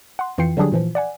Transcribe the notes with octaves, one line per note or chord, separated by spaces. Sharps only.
F#5 C6
F2 E3 F4 G5 C7 C#7
D3 F#3 G3 D4 G4 G#4
A#2 E3 F3
D5 F#5 G#5